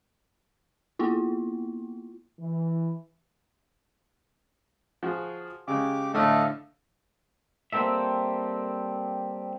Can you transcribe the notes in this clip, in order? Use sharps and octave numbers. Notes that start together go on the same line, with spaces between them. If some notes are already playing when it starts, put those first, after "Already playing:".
A#3 B3 E4 F4
E3
F3 F#4 G#4
C#3 G#3 G4 D6
A2 D3 A3 A4 D#5 F5
G3 A#3 C4 A4 E5